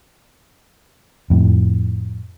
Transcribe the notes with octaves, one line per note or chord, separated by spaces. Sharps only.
F2 A2